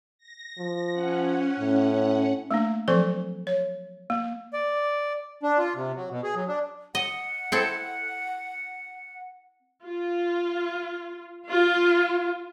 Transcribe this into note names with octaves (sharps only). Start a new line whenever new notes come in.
A#6
F3
C#4 F#5
A2
A3 A#3 D4
F3 F#3 C4 A4 C5 D5
C#5
A#3
D5
D4
F4
C3
F#3
B2
G#4
F#3
D4
D#5 F#5
C4 E4 A4
F4
F4